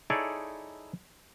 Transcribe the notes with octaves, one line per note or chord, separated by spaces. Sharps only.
D#4 E4 G#4 A4 C#5 D5